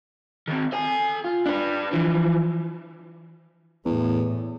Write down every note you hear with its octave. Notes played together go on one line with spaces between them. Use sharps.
D#3 C4
A4 G#5
F4
D4 B4
E3 F3
E2 A2